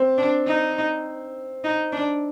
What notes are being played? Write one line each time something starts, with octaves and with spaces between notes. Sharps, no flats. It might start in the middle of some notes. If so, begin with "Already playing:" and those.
Already playing: C4
D4
D#4
D#4
D4